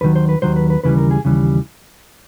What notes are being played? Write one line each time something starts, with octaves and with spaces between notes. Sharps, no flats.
D#2 D#3 F#3 B4
C5
B4
D#2 D#3 F#3 C5
B4
B4
D#2 C#3 E3 G3 B4
A#4
G#4
D#2 C#3 E3 G3